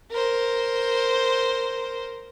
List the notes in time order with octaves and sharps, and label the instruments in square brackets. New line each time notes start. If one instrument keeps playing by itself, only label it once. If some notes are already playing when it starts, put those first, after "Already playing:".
[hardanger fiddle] A#4 C5